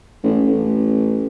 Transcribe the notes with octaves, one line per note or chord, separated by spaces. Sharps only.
A1
A1